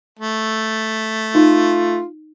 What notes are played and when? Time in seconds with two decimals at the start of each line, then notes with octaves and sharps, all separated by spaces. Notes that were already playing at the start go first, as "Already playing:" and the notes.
0.19 A3
1.35 D#4 F4